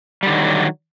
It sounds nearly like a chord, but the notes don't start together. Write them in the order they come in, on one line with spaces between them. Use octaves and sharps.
G3 D3 D#3 F#3